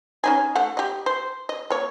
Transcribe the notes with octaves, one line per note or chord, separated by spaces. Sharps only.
C#4 D#4 G#4
A3 F#5
G4 D#5
C5
D#5
A#3 C#5